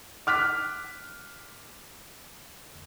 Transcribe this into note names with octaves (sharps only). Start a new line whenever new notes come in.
D6 F6 F#6 B6